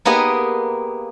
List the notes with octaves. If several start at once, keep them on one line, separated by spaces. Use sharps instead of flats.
A#3 B3 G4 G#4 D#5 F#5